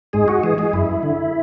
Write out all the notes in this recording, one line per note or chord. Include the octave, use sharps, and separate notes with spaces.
G#2 G#3 G#4
F#4
E3 G#3 G#4
G#3 G#4
F#2 E4
D3